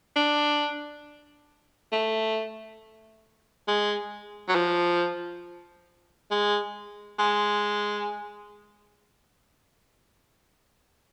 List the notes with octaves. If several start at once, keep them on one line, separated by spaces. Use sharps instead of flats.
D4
A3
G#3
F#3
F3
G#3
G#3